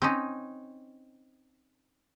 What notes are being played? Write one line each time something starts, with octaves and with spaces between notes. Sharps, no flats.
C4 C#4 D#4